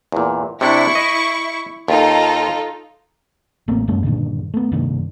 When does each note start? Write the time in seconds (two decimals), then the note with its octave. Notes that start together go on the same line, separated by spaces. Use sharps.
0.12 E2 A#2
0.61 C3 D4 E4 C#6
0.95 D#5
1.88 D#2 D#4 F4 A4
3.68 A1 A3 A#3 C4
3.88 F#2 G#3 A#3 C#4
4.04 G2 A#2 D3 D#3
4.54 A3 B3
4.72 G2 C3 D#3 A#3